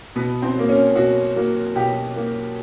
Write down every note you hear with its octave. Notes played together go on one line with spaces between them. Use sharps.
B2 B3
C4
F#3 A#3
C#4
B2 F#4
F#3 A#3
B2 G4
F#3 A#3